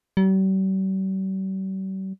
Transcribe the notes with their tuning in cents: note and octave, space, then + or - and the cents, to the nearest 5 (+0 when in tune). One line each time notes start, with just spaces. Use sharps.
G3 -45